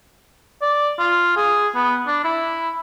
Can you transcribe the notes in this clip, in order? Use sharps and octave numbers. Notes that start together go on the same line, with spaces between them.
D5
F4
G#4
B3
D4
E4